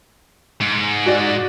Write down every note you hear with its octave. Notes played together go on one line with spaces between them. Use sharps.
G#2
F#4 D5